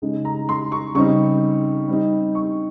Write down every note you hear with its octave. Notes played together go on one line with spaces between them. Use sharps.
C#3 G#3 D#4
A#5
C6
C#6
C#3 G3 C4 D#4 C#6
G3 C4 D#4
C#6